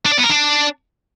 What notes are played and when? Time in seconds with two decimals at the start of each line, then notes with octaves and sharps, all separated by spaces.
0.06 D4
0.11 D5
0.17 B3
0.23 A#4
0.29 D4